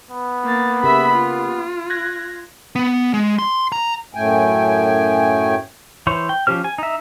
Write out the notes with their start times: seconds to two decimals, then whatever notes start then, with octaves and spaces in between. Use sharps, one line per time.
0.11 B3
0.44 A#3 A6
0.83 C#3 A#3 G4 E5 B5
1.13 F4
1.90 F#6 G#6 A#6
2.76 B3
3.14 G#3
3.39 C6
3.72 A#5
4.15 F#2 A2 A3 G5 G#5
6.07 E3 C5 C#5
6.29 G5
6.47 F3 C#4 G4 C5 F6
6.64 G#5
6.78 D#4 E5